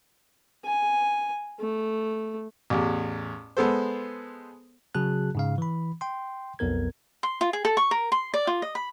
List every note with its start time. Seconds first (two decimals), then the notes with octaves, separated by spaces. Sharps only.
0.65 G#5
1.60 A3
2.70 A1 E2
3.57 G#3 B3 A4 C5
4.95 C#3 F#3 F#4 G#4 A5 F#6
5.35 G#2 C#3 F5
5.58 E3 B5
6.01 G5 C6
6.59 B1 F2 B3 A#4 G#6
7.23 C6
7.41 F4
7.53 G#4
7.65 A4
7.77 C#6
7.91 A#4
8.12 C6
8.34 D5
8.47 F4
8.62 D#5
8.75 B5